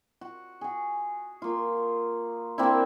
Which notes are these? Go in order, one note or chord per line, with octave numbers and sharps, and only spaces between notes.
F#4
F#4 G#4
A#3 F4
A#3 C4 D4 E4